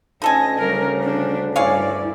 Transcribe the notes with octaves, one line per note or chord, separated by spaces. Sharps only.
D2 C#4 D#4 A4 D#5 G#5
C#3 G3 C#4 A#4
C#4 D4
G2 E4 G#4 C#5 D5 F5